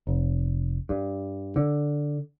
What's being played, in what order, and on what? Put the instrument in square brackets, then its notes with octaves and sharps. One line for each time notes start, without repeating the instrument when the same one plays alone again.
[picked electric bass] F1
G2
D3